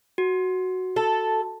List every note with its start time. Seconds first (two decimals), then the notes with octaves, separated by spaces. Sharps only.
0.18 F#4
0.96 A4